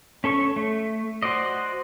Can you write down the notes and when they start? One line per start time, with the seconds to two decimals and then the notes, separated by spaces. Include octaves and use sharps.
0.24 C#4 A4 C#5 C#6
0.56 A3
1.23 F#4 C5 D5 D#5